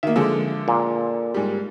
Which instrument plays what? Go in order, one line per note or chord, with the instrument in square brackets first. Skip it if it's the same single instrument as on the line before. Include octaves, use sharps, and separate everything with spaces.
[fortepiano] D#3 A#3 [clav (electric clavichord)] E5
[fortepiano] D3 F3 G#3
[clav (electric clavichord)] A#2
[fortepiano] G#2 G3